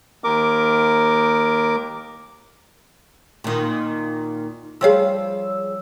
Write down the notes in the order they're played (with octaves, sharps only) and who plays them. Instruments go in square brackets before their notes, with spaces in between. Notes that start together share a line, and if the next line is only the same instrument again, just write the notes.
[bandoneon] D#2 A#4 D6
[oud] A#2 D#3
[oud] F3 G3 F5 [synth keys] G#4 C#5 E6